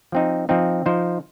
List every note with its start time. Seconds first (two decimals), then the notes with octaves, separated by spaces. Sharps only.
0.12 F3 C4 D#4
0.49 F3 C4 D#4
0.86 F3 D#4 C5